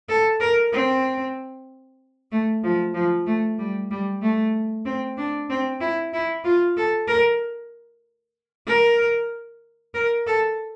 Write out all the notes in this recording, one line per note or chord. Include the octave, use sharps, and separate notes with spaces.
A4
A#4
C4
A3
F3
F3
A3
G3
G3
A3
C4
D4
C4
E4
E4
F4
A4
A#4
A#4
A#4
A4